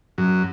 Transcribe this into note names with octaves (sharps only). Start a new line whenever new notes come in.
F#2